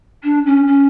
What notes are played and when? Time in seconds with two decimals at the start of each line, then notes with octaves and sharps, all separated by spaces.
0.24 D4
0.46 C#4
0.67 C#4